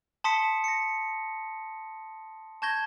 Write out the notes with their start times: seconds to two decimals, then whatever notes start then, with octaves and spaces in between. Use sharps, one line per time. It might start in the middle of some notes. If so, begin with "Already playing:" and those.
0.24 A5 C6 D#6 B6 C#7
0.64 A#6 C#7
2.62 A5 C#6 G6 G#6 A#6 G7